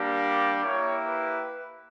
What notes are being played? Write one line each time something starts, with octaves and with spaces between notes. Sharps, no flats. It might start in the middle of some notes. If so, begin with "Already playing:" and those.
Already playing: G3 A#3 D4 G4
D5
A#3 E4 G4 C#5
B4